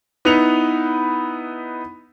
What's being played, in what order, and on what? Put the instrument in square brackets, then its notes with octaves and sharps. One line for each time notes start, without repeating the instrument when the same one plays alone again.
[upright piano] B3 D#4 E4 B4 C#7 F7